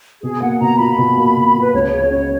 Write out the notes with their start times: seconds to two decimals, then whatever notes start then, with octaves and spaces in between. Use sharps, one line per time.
0.22 B2 G#4
0.41 A#3 F#5
0.60 B2 A#5
0.79 F4 B5
0.98 B2
1.17 A#3
1.36 B2
1.55 F4
1.61 B4
1.73 C#2 C#5
1.92 C#3 C#5
2.11 C#4 C#5